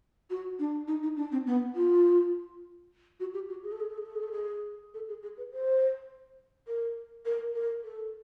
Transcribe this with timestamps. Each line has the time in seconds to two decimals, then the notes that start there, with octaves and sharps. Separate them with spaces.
0.30 F#4
0.59 D4
0.88 D#4
1.03 D#4
1.17 D4
1.32 C4
1.47 B3
1.75 F4
3.20 F#4
3.34 G4
3.49 F#4
3.64 G#4
3.72 A4
3.80 G#4
3.89 A4
3.98 G#4
4.06 A4
4.15 G#4
4.23 A4
4.32 G#4
4.94 A4
5.09 G#4
5.23 G#4
5.37 B4
5.52 C5
6.68 A#4
7.25 A#4
7.55 A#4
7.84 A4